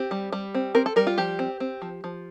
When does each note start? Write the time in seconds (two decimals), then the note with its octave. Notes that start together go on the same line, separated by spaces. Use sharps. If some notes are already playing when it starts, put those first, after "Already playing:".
Already playing: C4 G4
0.11 G3
0.33 G3
0.55 C4
0.75 C4 A#4
0.86 A4
0.96 G3 A#4
1.07 F4
1.18 F3 G4
1.39 C4
1.60 C4
1.82 F3
2.04 F3